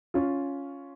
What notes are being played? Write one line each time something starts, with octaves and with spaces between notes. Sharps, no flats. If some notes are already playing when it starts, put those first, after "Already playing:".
C#4 F4